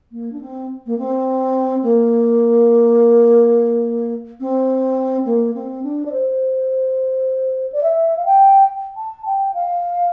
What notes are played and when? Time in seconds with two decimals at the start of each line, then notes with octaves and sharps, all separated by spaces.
0.11 A#3
0.32 D4
0.41 C4
0.86 A#3
0.98 C4
1.83 A#3
4.40 C4
5.25 A#3
5.54 C4
5.83 D4
6.05 D5
6.12 C5
7.72 D5
7.83 E5
8.17 F5
8.25 G5
8.97 A5
9.26 G5
9.54 F5